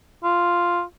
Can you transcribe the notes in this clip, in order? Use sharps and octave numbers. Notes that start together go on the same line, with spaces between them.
F4